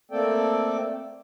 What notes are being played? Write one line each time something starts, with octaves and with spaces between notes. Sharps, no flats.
A3 A#3 C4 A4 D5 G5